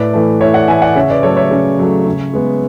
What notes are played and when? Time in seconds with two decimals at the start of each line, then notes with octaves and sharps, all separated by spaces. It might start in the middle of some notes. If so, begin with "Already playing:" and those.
Already playing: A2 B4 D5
0.13 E3 A3
0.40 A2 C#5 E5
0.54 D5 F#5
0.68 E3 A3 E5 G#5
0.82 D5 F#5
0.95 C#3 C#5 E5
1.10 B4 D5
1.23 F#3 A3 A4 C#5
1.37 C#5 E5
1.51 C#3
1.79 F#3 A3
2.06 C#3
2.34 G#3 B3